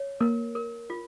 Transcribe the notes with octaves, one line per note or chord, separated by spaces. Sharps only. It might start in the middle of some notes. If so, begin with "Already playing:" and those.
Already playing: C#5
A#3 A#4
A#4
F4